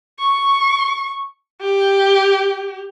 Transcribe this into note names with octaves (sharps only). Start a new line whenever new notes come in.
C#6
G4